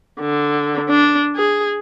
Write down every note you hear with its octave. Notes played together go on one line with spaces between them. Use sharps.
D3
D4
G#4